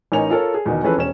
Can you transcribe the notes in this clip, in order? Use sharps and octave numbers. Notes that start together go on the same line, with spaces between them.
A1 D#4 A#4 C#5 G#5 F7
F4 A4 A#4 C#5
G#4
E2 B2 D#3
E3 F3 C#4 G#4 A4 B4
E1 C#4 E7